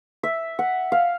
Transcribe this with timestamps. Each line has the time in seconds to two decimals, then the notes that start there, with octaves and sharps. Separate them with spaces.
0.23 E5
0.59 F#5
0.92 F5